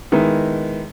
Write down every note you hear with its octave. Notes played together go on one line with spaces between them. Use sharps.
D#3 G#3 B3 E4